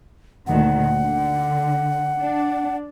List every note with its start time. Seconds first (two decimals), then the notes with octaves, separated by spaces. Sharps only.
0.47 D2 A#2 D#3 F#5
1.01 D3
2.18 D4